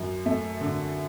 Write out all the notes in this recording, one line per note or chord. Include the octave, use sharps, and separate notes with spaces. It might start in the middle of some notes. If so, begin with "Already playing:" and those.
Already playing: F#2
A3
D3